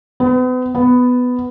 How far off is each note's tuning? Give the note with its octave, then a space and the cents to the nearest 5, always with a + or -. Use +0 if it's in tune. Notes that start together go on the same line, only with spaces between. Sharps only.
B3 +40
B3 +10